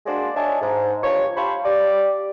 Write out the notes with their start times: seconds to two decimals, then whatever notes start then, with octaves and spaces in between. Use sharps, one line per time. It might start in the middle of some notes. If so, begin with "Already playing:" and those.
0.06 G#3 A#3 D4 F#4 C5 D5
0.36 D4 C#5 D#5 E5 G#5 A5
0.61 G#2
1.02 G2 F3 C#5
1.36 G4 C5 F5 A5 B5 C#6
1.64 G4 D5